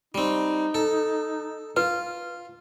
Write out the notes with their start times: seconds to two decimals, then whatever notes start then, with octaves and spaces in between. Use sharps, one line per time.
0.15 G3 C4 D#4
0.74 A4
1.77 F4 B4